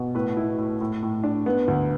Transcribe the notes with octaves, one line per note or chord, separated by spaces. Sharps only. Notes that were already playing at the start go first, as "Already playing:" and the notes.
Already playing: B2
A2 B4
E4
A2
A2
A2
D4
B3
D2